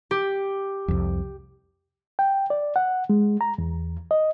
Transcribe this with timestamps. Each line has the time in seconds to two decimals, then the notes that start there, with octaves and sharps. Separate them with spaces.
0.11 G4
0.88 C2 F2
2.19 G5
2.50 D5
2.76 F#5
3.10 G#3
3.41 A#5
3.58 E2
4.11 D#5